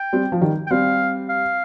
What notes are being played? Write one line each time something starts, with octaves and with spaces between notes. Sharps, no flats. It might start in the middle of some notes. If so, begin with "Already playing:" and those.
Already playing: G5
G3 C4
F3
D#3 G3
G5
G3 C4 F5
F5